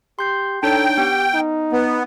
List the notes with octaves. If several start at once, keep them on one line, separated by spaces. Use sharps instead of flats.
G4 C6 G6 C7
D4 D#4 A4 C#5 G5
B3 G4
D#4
B3